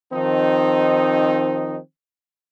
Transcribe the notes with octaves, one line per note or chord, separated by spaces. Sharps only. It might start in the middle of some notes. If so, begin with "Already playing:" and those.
D#3 F3 C4 D#4